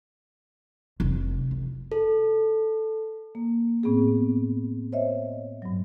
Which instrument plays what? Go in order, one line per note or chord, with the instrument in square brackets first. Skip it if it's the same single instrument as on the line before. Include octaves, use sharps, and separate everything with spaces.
[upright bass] F1
F#1
[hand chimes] A4
[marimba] A#3
A2 B3 C4 G#4
C5 C#5 D#5 E5
G2 F#3